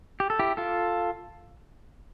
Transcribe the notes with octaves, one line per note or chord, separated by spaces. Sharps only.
G4
A4
E4 G4
F4 A4